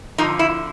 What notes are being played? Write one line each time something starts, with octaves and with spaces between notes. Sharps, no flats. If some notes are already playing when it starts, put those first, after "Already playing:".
F2 D3 F3 D#4
E4